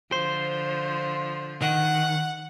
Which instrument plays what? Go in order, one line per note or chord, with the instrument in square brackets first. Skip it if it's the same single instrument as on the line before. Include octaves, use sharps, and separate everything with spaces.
[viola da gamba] D3 F3 [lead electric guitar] C5
[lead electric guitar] D#3 [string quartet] F#5